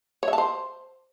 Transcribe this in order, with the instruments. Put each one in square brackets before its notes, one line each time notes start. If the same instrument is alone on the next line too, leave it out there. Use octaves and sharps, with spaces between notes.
[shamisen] C#5
E5
A5
C5